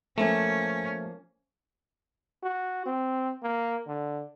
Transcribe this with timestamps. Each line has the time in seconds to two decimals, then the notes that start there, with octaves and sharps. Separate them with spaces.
0.18 F3 A3 A#3 C#4 C5
2.43 F#4
2.86 C4
3.43 A#3
3.87 D3